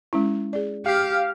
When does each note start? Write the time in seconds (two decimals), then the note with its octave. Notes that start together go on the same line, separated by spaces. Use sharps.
0.13 G#3 C#4 E4
0.53 G#4 D5
0.86 G4 F5